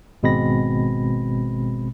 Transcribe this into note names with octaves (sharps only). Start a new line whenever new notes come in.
G#1 B2 G#3 C4 B5 A#6